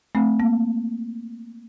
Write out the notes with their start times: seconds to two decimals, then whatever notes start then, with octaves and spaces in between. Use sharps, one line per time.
0.15 A3 C4
0.40 A#3